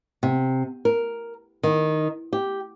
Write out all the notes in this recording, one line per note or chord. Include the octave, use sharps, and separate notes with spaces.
C3
A#4
D#3
G4